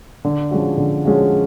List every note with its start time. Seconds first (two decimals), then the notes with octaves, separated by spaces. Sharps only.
0.25 D3
0.51 F3 G#3 C#4 F#4
0.78 D3
1.05 F3 G#3 C#4 F#4